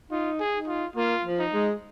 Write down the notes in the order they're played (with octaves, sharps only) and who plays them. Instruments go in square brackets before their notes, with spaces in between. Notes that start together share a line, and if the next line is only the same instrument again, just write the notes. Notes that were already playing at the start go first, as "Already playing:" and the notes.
[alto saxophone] D#4 [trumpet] F4
[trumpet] G#4
[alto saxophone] D#4
[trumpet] F4
[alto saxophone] A#3 [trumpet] F4
[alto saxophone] F3
[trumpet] D#4
[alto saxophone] G#3